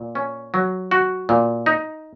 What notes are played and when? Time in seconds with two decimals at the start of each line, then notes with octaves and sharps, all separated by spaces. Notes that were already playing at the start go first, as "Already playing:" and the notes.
Already playing: A#2
0.15 C#4
0.54 F#3
0.91 F#4
1.29 A#2
1.66 D#4